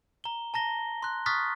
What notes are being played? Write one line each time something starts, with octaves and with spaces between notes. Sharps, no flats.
A#5 G7
A5 A#5 A#6 G7
C6 F#6
C#6 D#6 F6 F#6 A6 B6